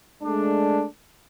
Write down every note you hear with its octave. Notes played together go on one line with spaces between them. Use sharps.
G#3 A3 D4